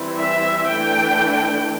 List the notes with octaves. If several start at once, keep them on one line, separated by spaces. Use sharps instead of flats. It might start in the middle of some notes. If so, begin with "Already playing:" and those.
Already playing: E3 G3 C4
E5
E3 A3 D4 G5